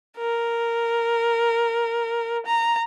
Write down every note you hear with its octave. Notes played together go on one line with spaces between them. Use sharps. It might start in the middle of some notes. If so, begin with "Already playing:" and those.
A#4
A#5